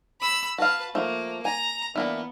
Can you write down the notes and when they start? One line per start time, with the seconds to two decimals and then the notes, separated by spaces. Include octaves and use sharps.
0.21 B5 E6
0.58 F#4 B4 F5 A5
0.95 F3 A3 A#3
1.45 G#5 A#5
1.96 E3 A#3 B3 D4